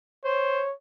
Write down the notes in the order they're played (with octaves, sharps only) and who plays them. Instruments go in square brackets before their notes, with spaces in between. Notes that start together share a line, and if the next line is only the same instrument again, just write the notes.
[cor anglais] C5 [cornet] C#5